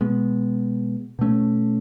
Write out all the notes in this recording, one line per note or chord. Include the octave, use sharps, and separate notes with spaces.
B2 G#3 B3
B2 A3 C#4